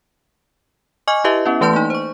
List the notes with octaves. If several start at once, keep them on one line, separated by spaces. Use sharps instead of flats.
D#5 G#5 C#6 D6 F6
E4 G4 B4 D#5 E5
B3 C#4 E4
E3 A3 B4 A5 C6 G6
A#3 D#4
C5 C#6